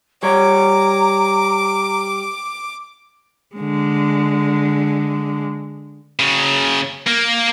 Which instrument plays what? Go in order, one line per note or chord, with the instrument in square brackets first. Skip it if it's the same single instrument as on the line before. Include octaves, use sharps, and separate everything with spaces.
[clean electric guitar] G3 C#5 [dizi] A#5 [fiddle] D6
[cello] D3 G#3
[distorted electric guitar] C#3 F#3
A#3